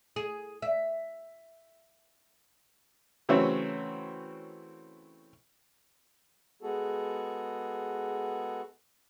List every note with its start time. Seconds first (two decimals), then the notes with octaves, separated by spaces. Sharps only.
0.16 G#4
0.62 E5
3.29 C#3 E3 F#3 A3 C4 C#4
6.62 G#3 B3 F#4 G#4 A4